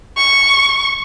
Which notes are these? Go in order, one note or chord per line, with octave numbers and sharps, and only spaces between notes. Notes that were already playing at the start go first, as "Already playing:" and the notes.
C#6